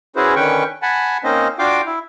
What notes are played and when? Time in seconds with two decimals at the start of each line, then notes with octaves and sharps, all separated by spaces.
0.16 C#4 E4 F#4 G#4 B4 C5
0.36 D3 D#3 C#4 B4 G5 C#6
0.82 F#5 G#5 A5 B5
1.24 A#3 C4 C#4 D#4 C5 D#5
1.59 D4 F4 F#4 F5 G5 D6
1.86 E4